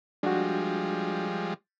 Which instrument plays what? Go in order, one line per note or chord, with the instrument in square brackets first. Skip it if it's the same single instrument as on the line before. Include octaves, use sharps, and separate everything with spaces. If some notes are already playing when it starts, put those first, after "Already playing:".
[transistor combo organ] F3 G3 G#3 [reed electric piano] D4 F#4